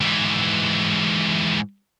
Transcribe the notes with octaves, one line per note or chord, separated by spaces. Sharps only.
G#2 E3